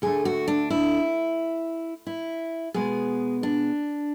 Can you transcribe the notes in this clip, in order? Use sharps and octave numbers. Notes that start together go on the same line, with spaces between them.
D2 D3 A3 G#4
F#4
D4
E4
E4
B2 G#3 B3 G#4
D4